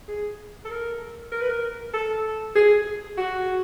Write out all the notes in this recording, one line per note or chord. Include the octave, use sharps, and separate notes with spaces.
G#4
A4
A#4
A#4
B4
A#4
A4
G#4
F#4